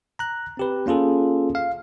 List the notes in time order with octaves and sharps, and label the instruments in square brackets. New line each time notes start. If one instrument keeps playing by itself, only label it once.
[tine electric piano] A#5 F#6
C4 G4 B4
A#3 C#4 F4 G#4 A4
F5